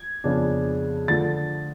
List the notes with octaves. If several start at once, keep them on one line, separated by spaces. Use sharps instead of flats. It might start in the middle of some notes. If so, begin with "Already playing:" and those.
Already playing: G#6
F2 C#3 F3 B3 D4
D3 F3 A3 A6